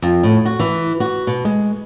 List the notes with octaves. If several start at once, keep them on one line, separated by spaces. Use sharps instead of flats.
F2
A2
F#4
E3
F#4
B2
G#3